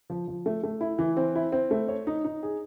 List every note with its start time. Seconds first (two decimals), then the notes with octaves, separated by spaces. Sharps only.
0.10 F3
0.28 F3
0.46 A3
0.63 A3
0.81 E4
0.99 E3
1.17 C4
1.35 E4
1.52 C4
1.71 A3
1.89 C#5
2.07 D#4
2.24 D#4
2.43 G#4